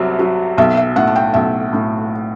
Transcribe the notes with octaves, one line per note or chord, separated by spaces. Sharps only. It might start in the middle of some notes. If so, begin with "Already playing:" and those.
Already playing: C2 C3 F#3
F#3
B1 E5
E5
A2 F#5
A5
G5
B1 E5
A2